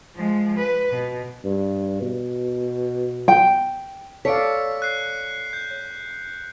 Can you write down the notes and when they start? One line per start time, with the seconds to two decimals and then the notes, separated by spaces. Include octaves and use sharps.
0.16 F3 G#3
0.58 B4
0.91 B2
1.45 G2
2.02 B2
3.28 G5
4.25 A4 C#5 D5 F5 B6 C#7 D7
4.82 F#6 C7
5.53 G6